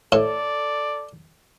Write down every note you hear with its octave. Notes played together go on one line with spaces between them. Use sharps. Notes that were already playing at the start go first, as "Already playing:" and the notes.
A2 A4 D5